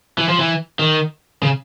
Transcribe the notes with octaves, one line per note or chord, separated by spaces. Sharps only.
E3
F3
E3
D#3
C#3